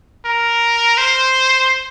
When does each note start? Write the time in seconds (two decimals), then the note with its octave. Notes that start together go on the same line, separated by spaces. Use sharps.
0.26 A#4
0.98 C5